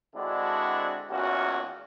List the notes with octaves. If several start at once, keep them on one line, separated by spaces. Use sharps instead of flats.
D3 G#3 C4 D4 E4 F#4
G#1 E2 A#2 C#4 F#4